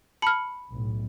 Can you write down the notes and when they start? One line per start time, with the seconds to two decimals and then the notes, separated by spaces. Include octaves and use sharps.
0.22 A5 B5 F6 C#7
0.71 B1 A2